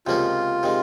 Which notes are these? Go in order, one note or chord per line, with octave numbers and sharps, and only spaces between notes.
C#2 C3 F3 A#3 C#4 F4
C3 D#3 G#3